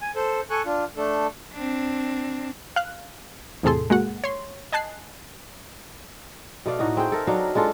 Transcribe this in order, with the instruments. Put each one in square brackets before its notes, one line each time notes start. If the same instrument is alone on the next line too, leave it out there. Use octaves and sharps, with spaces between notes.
[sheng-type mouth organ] G#5
A4 C5
A4 G#5 C#6 F#6
D4 F4
A3 D4 A4
[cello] C4 D4
[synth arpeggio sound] F5 F#6
E2 A2 C3 G#4 A4 C6
G#3 A#3 F#4 F#5
C#5 C6
D#5 G#5 A5 F#6 C7
[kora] B2 A3 D5 F5
A2 D#4 F#4
C4 G#4 G5
A4 A#4 E5
F#3 D4 D#4 F5
G#3 D4 F4 A4